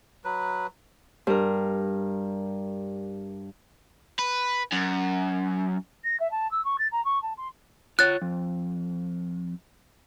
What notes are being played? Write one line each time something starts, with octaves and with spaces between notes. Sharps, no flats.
F#3 B4
G2 A#4
B4
F#2
A#6
E5
A5
E6
C#6
A6
A#5
C#6
A5
C6
F4 C#5 F#6 A6
F2